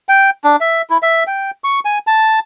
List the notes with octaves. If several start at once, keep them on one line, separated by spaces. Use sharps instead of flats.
G5
D4
E5
E4
E5
G5
C#6
G#5
A5